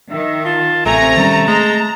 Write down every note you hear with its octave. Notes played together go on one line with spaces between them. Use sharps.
D#3 E5
F4 A5
A1 C3 A3 G#5 A#5
D#3 G3 C#4 A5
G#3 A3 A#5